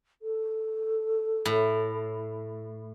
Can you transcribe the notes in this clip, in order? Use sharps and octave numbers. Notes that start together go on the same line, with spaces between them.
A4
A2